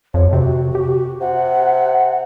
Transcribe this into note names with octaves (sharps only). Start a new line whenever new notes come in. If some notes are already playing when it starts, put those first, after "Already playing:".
F2 C#5
C3 F#4
G4
C3 F#5